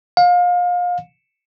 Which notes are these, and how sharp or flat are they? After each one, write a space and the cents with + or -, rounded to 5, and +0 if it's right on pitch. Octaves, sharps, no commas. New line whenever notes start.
F5 +30